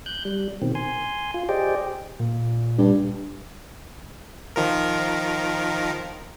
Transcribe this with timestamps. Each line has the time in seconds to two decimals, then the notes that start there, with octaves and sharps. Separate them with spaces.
0.06 F#6 G6
0.25 G3
0.62 B2 D#3 C4
0.75 G#5 C6
1.34 F4
1.49 G4 G#4 C5 D5 D#5 G5
2.20 A#2
2.78 G2
4.56 D#3 F3 A#4